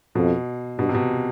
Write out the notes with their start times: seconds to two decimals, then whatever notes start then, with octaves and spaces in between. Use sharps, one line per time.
0.15 F2 B2
0.79 G2 B2
0.89 C3
0.95 B2